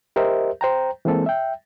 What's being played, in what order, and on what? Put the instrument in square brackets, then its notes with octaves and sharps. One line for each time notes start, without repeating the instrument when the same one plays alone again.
[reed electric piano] G4 A#4 C5 D#5 E5
C5 G5 A#5
E3 G#3 A#3 C4 A4
E5 G5